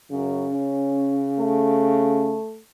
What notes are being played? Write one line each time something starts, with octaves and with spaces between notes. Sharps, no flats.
F#2 C#3
C#4
A3